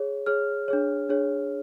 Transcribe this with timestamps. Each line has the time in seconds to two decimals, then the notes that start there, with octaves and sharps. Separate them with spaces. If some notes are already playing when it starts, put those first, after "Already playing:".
Already playing: G#4 C#5
0.26 G#4 C#5 F6
0.68 D4 G#4 C#5
1.09 D4 G#4 C#5